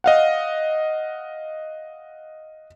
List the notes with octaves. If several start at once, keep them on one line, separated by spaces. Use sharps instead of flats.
D#5 F5 F#5